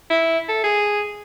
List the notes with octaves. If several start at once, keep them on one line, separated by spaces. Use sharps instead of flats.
E4
A4
G#4